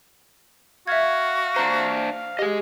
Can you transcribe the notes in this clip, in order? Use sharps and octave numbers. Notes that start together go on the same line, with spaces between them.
F#4 E5 F5 G#6
D4 C5 A#5
G4 G#4 D#5